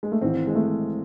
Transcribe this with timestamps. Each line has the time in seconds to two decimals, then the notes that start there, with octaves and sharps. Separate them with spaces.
0.03 G#3
0.12 A3
0.21 G#1 G#2 E3 C4
0.47 G#3
0.55 A3